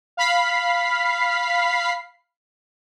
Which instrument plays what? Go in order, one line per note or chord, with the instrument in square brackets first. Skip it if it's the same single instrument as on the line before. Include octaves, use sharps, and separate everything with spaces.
[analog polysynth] F5 B5 B6 C7